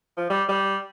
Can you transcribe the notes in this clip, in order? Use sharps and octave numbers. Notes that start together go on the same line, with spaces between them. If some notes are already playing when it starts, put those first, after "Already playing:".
F3
G3
G3